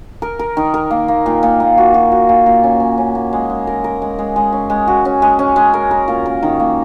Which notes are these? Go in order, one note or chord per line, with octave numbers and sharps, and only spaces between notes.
A#4
A#4
D#3
A#4
A#3
A#3
A#2
A#2
A#3
F#4
F#4
F#4
A#2
A#2
C#4
C#4
C#4
A#3
G#3
G#3
A#4
A#4
G#3
G#3
G#3
C#4
G#3
F#4
C#4
G#3
C#4
G#3
A#4
A#4
A#2
A#4
D#3
A#3